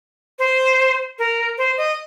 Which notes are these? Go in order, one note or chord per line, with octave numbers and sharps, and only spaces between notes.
C5
A#4
C5
D#5